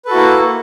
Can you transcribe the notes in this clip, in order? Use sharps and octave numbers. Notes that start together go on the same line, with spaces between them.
A#3 E4 F#4 A4 B4